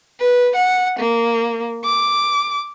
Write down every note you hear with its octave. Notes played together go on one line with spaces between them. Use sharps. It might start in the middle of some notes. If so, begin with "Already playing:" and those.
B4
F#5
A#3
D6